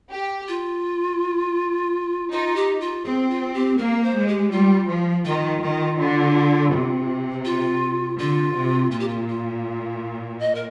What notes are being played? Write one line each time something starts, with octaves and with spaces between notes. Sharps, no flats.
G4
F4
D#4 F4
G4
F4
C4 G#4
F4
G4
A#3 A#4
C5
G#3
G4
G3 F4
F3
D#3 F4
D#3
D3
C3
F4
D3 F4
C3
A#2 F4
G4
F4
F4
D#5
A#4